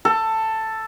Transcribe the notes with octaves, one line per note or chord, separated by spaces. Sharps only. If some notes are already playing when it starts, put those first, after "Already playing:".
A4